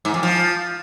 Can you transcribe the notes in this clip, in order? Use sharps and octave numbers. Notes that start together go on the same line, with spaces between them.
G#2
F2
F3